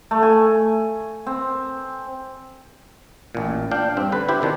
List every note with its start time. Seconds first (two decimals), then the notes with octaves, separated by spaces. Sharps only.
0.11 A3
0.23 G#5
1.27 C4
3.35 A1 A#2
3.71 D4 F5 G5
3.97 G2 C4
4.12 D3 B4
4.29 E4 G4 C5
4.42 C3 D#3 D4